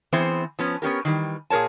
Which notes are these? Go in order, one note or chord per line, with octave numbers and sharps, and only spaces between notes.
E3 B3 C4 G#4 C5
F3 B3 C#4
B3 C#4 G4 A#4
D#3 E3 G3
A#2 G#4 A#4 C#5 A5